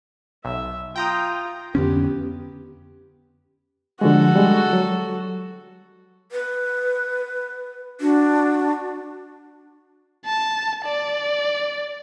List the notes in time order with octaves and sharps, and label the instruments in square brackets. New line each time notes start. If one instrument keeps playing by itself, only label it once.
[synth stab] B1 [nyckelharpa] E5
[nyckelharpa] F4 [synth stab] G5 A#5 D#6
[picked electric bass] F2 D3 C#4 [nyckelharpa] B3 G4
[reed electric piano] D3 F3 G#3 [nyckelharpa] F#4 A4
[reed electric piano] G3 G#3
F#3
[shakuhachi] B4
[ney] D4 [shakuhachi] F#4
[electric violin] A5
D5